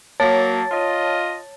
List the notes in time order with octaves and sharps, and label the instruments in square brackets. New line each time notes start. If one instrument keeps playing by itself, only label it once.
[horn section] F#3 A#3 [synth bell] C#5 A5 A6
[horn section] F4 D#5